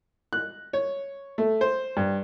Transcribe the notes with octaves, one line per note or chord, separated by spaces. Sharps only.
F#6
C#5
A3
C5
G2